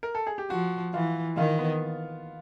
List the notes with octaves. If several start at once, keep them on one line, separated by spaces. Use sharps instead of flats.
A#4
A4
G#4
G4
F3 F#4
E3 F4
D#3 F4
B3